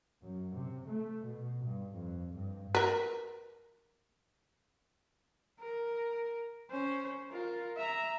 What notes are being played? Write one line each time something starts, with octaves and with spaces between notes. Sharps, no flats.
F#2
C3
A3
B2
G2
F2
G2
A#4 B4
A#4
C#4 C5
F4 A#4
E5 A#5